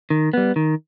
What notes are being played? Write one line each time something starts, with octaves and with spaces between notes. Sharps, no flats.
D#3
G3 B3
D#3